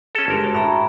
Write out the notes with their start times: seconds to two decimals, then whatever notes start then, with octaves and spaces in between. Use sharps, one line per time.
0.15 C#4 G#4 A4 A5
0.28 G1 G#3 A#4 C6 D6
0.41 F#4 A5
0.55 A2 E5 A#5 B5